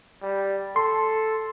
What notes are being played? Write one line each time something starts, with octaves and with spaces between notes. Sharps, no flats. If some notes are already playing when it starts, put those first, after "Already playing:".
G3
A4 C6